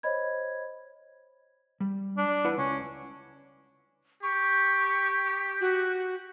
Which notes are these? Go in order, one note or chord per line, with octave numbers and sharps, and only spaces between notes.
C5 C#5 D#5 B5 G#6
G3
D4
E4 B4 F#5
C#2 C#4
G4 C#6
F#4